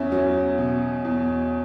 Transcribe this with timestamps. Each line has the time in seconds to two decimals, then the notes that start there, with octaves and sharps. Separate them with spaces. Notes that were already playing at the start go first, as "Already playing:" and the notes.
Already playing: E2 C#4 E5
0.12 F#3 C#4
0.58 B2
1.05 E2